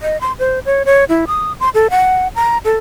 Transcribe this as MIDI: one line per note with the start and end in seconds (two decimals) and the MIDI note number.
0.02 0.20 75
0.21 0.33 84
0.39 0.59 72
0.65 0.83 73
0.85 1.04 73
1.09 1.25 64
1.27 1.53 87
1.60 1.69 84
1.74 1.88 69
1.90 2.28 78
2.35 2.58 82
2.65 2.77 69